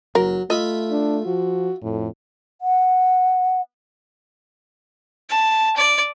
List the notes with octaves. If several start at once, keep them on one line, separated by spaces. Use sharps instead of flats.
F#1 F#3 A#4
A3 F4 D#5 E5 B5
D4
F3 F#4
F2 A2
F#5
A5
D5